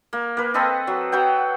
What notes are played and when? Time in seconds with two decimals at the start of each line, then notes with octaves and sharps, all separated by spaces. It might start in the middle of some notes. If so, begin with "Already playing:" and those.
0.13 A#3
0.37 A#3 B4
0.54 C4 A4 B4 D#5
0.87 F#3
1.12 F#3 B4 F#5 G5